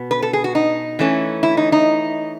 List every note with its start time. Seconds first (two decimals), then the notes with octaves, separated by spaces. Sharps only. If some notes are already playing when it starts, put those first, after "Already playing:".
Already playing: B2 B3
0.11 B4
0.22 A4
0.33 G#4
0.44 F#4
0.55 D#4
0.99 E3 A3 C#4
1.43 E4
1.57 D#4
1.72 D#4